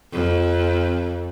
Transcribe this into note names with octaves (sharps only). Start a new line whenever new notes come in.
F2